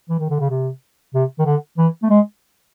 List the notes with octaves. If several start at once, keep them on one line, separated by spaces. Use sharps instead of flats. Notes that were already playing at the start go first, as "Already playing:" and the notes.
E3
D#3
D3
C#3
C3
C3
D#3
D3
E3
A3
G#3